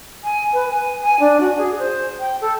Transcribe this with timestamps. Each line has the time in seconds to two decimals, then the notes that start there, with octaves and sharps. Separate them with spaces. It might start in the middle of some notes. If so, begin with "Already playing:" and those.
0.24 G#5
0.53 B4
0.70 G#5
1.03 G#5
1.20 D4
1.40 F#4
1.57 G#4
1.79 C5
2.20 G5
2.41 A4